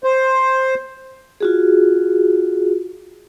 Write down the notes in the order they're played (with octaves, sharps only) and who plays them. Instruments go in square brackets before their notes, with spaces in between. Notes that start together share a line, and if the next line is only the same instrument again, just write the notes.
[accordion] C5
[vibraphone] F4 F#4 G#4